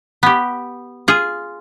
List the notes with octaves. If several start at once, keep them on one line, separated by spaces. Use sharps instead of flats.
B3 G4
F4 G#4